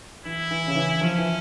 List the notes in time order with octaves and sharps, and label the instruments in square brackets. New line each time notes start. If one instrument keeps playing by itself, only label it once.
[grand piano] E3 [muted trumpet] E4
[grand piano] E3
C#3
E3
[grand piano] F3 [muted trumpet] C#4
[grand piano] E3